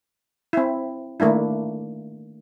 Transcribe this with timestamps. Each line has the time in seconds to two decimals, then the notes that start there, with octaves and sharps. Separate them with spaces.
0.53 C4 E4
1.20 D#3 A3 A#3 D4 E4